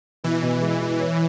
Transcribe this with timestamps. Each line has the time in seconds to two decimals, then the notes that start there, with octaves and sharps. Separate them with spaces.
0.24 B2 E3
0.42 B2
0.61 G#3
0.81 E4
1.00 C#5